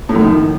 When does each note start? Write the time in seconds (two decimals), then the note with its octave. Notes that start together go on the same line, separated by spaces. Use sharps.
0.09 A2
0.15 F#2
0.21 D#3